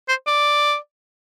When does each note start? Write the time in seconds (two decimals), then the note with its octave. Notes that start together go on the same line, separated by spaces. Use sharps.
0.08 C5
0.27 D5